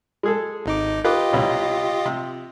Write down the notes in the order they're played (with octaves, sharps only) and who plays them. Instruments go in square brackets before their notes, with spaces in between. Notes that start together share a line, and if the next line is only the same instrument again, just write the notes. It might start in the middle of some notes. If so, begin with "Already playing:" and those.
[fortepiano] G#3 G#4 A4
[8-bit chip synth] G#1 D#4 D6
[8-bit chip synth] F4 G4 D#5 [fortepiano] B4 D6
[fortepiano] C2 B2 C#4
C3